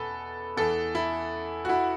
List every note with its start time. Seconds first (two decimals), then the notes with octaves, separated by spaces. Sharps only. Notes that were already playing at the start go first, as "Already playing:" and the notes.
Already playing: E2 B2 A4 B4
0.57 E2 E3 A4
0.95 E4
1.65 F#4
1.69 E4